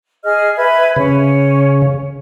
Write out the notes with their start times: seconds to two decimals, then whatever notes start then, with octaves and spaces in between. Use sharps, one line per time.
0.24 G#4 D#5 F6
0.57 B4 E5 G#6
0.96 C#3 C#4